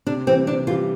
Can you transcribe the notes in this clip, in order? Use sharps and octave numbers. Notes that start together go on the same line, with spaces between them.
C3 D4
E3 G3 C4
C3 D4
E3 G3 F4